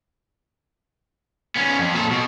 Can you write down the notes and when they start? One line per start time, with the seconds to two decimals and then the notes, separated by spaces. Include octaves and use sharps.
1.56 B3 C#4
1.79 F2
1.94 A#2 A4
2.11 B2